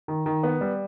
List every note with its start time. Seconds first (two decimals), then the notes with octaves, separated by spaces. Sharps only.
0.08 D#3
0.26 D#3
0.43 B3
0.61 G3